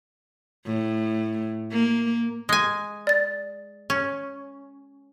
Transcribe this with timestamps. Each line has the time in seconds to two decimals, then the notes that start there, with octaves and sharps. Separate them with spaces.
0.65 A2
1.71 A#3
2.49 G#3 G#5
3.07 D5 A6
3.90 C#4